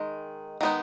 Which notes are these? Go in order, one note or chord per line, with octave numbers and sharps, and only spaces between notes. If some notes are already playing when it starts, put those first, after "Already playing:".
Already playing: D#3 G#3
D#3 G#3 B3 D#4